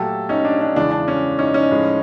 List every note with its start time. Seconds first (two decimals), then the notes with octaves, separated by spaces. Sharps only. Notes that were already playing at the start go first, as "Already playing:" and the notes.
Already playing: A#2 F#3 A3 G4 A4
0.29 C#4 D#4
0.45 D4
0.61 D4
0.76 E2 C#3 E3 G#3 D4
0.91 D4
1.08 C#4
1.39 C#4 D#4
1.54 C#4 D#4
1.71 A2 F3 G#3